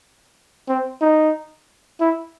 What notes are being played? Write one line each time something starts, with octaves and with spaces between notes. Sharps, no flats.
C4
D#4
E4